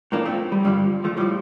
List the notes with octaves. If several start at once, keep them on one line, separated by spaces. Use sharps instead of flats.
A2 F3 A#3 D4
A3 C4
G3
G2 D3 F3 G3
F3 A3
A2 F3 G3